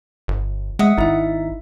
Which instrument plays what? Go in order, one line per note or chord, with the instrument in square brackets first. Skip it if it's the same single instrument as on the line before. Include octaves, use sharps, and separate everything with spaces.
[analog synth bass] G1
[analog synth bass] G#3 [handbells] E5 F#5 D#6
[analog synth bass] G#1 [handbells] D#4 E4 E5